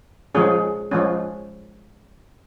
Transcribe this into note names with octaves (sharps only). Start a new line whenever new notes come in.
F3 G#3 C#4 G#4
F3 G#3 C#4